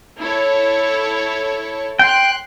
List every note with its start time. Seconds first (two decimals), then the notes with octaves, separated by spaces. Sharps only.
0.20 E4 A4 C#5
1.99 G5 C6 F#6